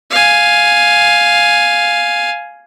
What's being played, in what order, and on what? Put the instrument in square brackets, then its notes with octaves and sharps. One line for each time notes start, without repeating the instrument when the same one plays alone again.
[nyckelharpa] F5 G#5